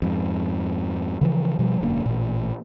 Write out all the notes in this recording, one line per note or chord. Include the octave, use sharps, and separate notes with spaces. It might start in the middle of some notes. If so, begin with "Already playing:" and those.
F2 G#2
C#3 E3 F3
B2 F3 G3
E1 F#2 D3 A#3
A1 A#2